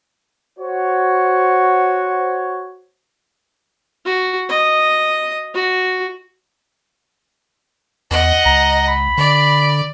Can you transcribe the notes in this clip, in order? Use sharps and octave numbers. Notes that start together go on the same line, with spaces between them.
F#4 C5 C#5
F#4
D#5
F#4
E2 D#5 F#5
C#2 A#5
B5
D3 D5